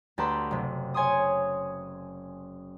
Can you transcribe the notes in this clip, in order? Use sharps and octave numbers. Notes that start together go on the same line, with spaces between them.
D2 G4 A4 B4 A#5 C6
F#1 C3
C#5 G#5 C6 D#6